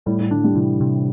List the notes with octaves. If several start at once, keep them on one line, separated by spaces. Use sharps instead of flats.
A2 G3
A2
D3 D4
G3
C3 E3
C3